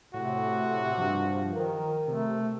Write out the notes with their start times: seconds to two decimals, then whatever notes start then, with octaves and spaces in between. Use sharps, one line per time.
0.14 A2 C3 F#4
0.98 G2 F3
1.54 D#3 A#4
2.08 C3 A3